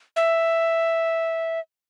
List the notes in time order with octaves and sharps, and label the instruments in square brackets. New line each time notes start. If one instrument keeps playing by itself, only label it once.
[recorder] E5